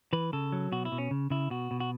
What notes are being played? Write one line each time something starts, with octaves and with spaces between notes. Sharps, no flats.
E3 B4
C#3 A4
F#3
B2 F#4
E4
B2
C#4
C#3
C#3 E4
B2 F#4
B2
F#4